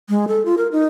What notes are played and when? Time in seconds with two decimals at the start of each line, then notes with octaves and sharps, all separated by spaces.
0.09 G#3
0.28 A4
0.45 F4
0.58 A#4
0.72 D#4